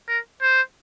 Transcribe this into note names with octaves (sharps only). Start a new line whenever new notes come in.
A#4
C5